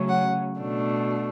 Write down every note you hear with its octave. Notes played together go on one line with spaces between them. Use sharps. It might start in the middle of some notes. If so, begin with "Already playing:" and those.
Already playing: C#3 F#3 A3 C#4
F#5
B2 A3 D4